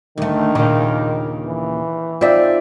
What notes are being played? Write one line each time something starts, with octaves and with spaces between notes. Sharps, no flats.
D2 D#3 A3
D#2 A#2 C#3 F5 D6
E3
C4 D#4 F4 D5 E5